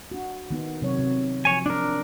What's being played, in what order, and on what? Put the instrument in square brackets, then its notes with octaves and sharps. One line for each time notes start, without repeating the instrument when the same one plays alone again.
[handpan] D4 F#4
D#3 B3 D#4
C3 F#3 C#5
C3
[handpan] F3 [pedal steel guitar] C#5 G#5
[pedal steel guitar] D4 A#4